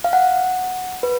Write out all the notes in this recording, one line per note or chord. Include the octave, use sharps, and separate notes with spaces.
F5
F#5
B4